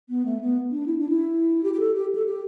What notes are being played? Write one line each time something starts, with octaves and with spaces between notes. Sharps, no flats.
B3
A3
B3
D4
E4
D4
E4
G4
G4
A4
G4
A4
G4